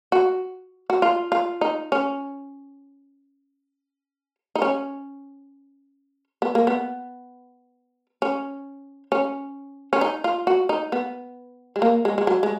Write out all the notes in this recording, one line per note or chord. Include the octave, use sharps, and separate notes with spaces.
F#4
F#4
F4
F4
D#4
C#4
D#4
C#4
B3
A#3
B3
C#4
C#4
C#4
D#4
F4
F#4
D#4
B3
G#3
A#3
G#3
G#3
F#3
G#3